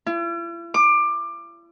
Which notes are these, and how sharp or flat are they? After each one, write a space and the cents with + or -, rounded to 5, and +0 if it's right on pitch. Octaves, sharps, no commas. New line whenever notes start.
E4 +45
D6 +20